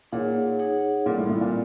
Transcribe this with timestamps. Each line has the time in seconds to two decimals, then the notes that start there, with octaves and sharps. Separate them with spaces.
0.12 A#2 D#4 G#4 C#5 F#5
0.59 D#4 G#4 C#5 F#5
1.06 A#2 G3 C4 F4 A4 D5
1.18 A2
1.29 A2
1.41 A#2